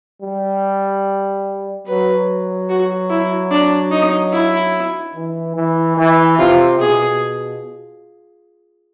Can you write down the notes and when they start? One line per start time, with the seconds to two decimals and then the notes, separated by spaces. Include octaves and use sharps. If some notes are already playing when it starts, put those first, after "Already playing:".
0.22 G3
1.87 F#3 B4
2.70 F#4
3.10 E4
3.51 D4
3.92 D#4
4.32 E4
5.15 E3
5.56 E3
5.97 E3
6.39 C3 F4
6.79 B2 G#4